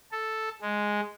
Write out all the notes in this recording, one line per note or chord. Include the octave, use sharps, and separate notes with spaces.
A4
G#3